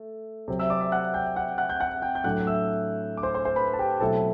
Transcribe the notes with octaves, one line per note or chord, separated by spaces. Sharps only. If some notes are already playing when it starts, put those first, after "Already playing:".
Already playing: A3
C3 F#3 C4
E5 E6
D5 D6
E5 E6
F#5 F#6
G5 G6
F#5 F#6
F#5 F#6
G6
F#5 F#6
G5 G6
G6
A2 F#3 A3 D4 F#5 F#6
E5 E6
D6
C5 C6
C5 C6
C5 C6
B4 B5
A5
G4 G5
B2 F#3 A3 C4 E4 A4 A5